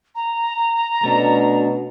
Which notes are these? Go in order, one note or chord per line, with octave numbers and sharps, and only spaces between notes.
A#5
B2 A3 C#4 D4